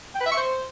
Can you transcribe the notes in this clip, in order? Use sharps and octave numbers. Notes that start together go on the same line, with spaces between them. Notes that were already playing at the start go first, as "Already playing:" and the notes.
G5
B4
E5
C#6
C5